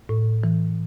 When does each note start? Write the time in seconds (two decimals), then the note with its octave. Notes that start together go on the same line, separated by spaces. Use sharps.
0.09 A2
0.44 E3